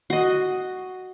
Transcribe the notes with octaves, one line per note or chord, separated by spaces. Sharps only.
F#4 D#5